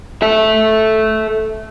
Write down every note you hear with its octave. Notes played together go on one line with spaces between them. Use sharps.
A4 E5